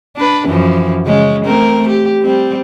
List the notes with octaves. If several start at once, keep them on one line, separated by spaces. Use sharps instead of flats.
D4 B4
F#2 E3 F3
C#3 G#3 C#4
A3 C4 A#4
G4
G3 C4